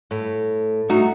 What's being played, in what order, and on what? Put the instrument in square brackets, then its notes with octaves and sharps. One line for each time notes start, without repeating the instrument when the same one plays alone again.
[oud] A2
[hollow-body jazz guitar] A3 F#4 [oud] D#4